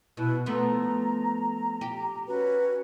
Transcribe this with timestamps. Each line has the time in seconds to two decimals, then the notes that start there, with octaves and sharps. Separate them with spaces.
0.17 B2 E4 F#6
0.46 F3 A3 B3 A#5
1.81 G4
2.27 C#4 F#4 B4